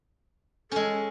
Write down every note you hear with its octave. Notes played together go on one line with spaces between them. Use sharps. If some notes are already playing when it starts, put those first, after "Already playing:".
G#3 C#4 A4